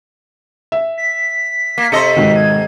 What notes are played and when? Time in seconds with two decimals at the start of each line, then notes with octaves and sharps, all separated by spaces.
0.72 E5
0.98 B6
1.78 A#3
1.92 C3 A4 D#5 C6 C#7
2.16 G#2 B2 D#3
2.36 G#6